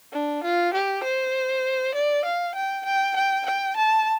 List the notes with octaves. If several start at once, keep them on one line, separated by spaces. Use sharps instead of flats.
D4
F4
G4
C5
D5
F5
G5
G5
G5
G5
A5